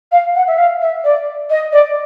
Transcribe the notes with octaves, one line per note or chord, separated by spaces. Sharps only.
F5
F#5
E5
F5
E5
D5
D#5
D5